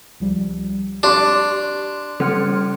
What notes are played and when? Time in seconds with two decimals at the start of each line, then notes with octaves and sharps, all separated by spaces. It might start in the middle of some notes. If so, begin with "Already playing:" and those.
0.20 C#2 F3 G3
1.03 D4 G4 C6 C#6
2.20 C#3 G3 C#4 A4 F6 C#7